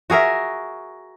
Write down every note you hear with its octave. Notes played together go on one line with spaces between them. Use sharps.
F#4 G#4 A#4 E5